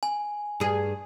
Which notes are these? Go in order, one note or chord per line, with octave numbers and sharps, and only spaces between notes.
G#5
G2 G#4